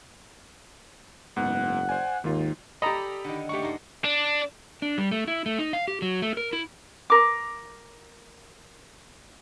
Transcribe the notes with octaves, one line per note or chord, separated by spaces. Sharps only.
F#1 G#2 B3 F#5
C5 D5 G#5
D#2 G#2 D#3 F4
G4 A4 D5 D#5 A#5 B5
D3 D#3
A3 A#3 G4 F#5 C#6
G#2 A#3
D4
D4
G3
A3
E4
A3
D#4
F5
G4
F#3
A3
A#4
E4
A#4 D6